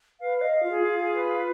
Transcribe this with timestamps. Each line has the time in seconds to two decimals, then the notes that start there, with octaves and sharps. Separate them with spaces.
0.21 B4 F5
0.38 D#5 F5
0.52 F5
0.63 F4
0.69 G#4
0.83 F4 F5
0.98 G#4
1.15 B4
1.29 F5